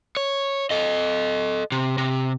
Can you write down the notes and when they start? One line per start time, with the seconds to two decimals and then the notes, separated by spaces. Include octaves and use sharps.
0.17 C#5
0.71 A4 D#5
1.72 C3
1.98 C3